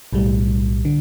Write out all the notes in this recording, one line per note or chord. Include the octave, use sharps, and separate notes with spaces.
B1 A2 G3
D3